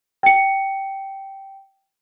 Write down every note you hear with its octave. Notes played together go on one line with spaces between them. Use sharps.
G5 C#7